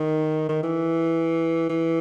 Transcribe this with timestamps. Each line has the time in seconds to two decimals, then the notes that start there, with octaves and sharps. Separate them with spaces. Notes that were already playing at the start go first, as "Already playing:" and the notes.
Already playing: D#3
0.49 D#3
0.63 E3
1.69 E3